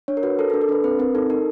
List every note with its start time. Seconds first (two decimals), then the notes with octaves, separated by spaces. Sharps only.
0.08 D4 C#5
0.17 A#4
0.23 F#4 B4
0.39 A4 A#4
0.50 A4
0.54 D4
0.61 A4
0.69 D4 B4
0.84 C4 B4
0.99 C4 A#4
1.15 D#4 A4
1.30 D#4 A#4